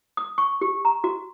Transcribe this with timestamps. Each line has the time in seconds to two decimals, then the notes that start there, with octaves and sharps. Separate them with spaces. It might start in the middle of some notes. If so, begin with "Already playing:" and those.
0.17 D#6
0.38 C#6
0.61 G4
0.85 A#5
1.04 F#4